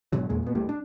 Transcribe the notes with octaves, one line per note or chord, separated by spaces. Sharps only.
G#2 B2 D3 F#3
E2 A#2 G#3
A#2 B3
D2 A2 G3
D4